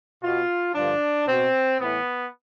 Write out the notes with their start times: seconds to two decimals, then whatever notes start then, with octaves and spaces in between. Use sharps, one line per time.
0.23 B2 F4
0.75 G2 D3 F3 D4
1.27 B2 C4
1.79 A2 E3 B3